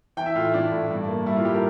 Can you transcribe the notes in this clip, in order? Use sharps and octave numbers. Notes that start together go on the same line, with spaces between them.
E3 G5
E5
A2 F4
E4
A2 D4
A2
G2
A#3
G3 E4
F4
G3 G4
A#4